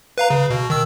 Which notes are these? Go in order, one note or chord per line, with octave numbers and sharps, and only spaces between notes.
B4 F5 A#5
C#3
B2
D#3 E6